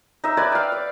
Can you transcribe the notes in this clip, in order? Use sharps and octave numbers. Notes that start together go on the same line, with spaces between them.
D#4 E5
B4 D5 G#5
F5 G5
D5